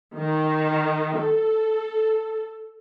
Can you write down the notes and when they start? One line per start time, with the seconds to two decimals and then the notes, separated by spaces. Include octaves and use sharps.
0.18 D#3
1.20 A4